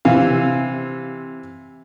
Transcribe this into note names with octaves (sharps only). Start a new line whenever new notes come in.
C3 E3 F5